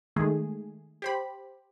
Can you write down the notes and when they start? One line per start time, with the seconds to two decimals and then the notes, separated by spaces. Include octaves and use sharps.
0.16 D#3 G#3 A3 G#4
1.02 G4 C5 B5